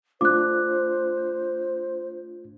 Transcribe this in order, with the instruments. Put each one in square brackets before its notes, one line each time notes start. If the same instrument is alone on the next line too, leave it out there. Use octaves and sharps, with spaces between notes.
[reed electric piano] A3 D4 F4 [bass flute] C5 [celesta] D6 F#6